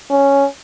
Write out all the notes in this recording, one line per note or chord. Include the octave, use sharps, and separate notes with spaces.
C#4